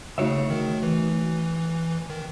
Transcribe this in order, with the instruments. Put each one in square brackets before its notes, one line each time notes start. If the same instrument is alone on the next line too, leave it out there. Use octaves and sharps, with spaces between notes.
[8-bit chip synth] C#3 [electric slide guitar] A3 D#4 F#4 C#5 E5
[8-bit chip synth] D#3
E3
D#3